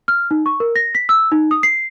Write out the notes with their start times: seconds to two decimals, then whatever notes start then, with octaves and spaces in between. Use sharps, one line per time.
0.08 F6
0.31 D#4
0.46 C#6
0.60 A#4
0.76 A#6
0.95 B6
1.09 E6
1.32 D#4
1.51 D#6
1.63 C7